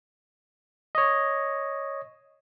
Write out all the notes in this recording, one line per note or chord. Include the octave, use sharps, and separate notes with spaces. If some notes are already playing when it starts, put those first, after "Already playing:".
C#5 D#5